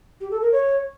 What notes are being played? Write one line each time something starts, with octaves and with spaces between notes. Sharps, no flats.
G4
A4
A#4
C#5